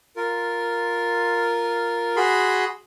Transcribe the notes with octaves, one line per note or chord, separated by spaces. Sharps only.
F4 A#4
F#4 G#4 B5 C6